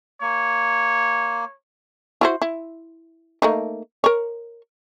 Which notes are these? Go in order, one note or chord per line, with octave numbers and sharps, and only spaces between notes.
A#3 C#5
E4 F#4 C5
E4
A3 A#3 D#4
A#4 C#5